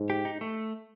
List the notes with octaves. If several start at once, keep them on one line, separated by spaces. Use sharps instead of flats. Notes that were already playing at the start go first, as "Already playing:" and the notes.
Already playing: G#2
G4
D#4
A3